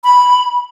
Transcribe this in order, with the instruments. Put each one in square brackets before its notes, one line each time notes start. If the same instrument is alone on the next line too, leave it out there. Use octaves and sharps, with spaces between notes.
[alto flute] B5